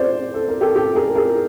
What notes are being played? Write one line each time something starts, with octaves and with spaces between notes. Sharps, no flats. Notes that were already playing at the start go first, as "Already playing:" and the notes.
Already playing: C5 D5
A4
A#4
G4 A4
G4 A4
G#4 A#4
G#4 A#4